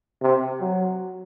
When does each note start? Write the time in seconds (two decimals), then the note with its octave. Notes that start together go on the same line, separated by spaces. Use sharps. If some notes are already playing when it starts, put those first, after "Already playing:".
0.22 C3
0.61 F#3